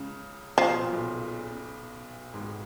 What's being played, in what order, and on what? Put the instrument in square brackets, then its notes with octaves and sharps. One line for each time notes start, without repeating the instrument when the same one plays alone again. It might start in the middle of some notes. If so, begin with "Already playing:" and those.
Already playing: [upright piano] C#2 C#3
[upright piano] C#3 [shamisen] F3
[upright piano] B2
A#2
B1 B2
G#1 G#2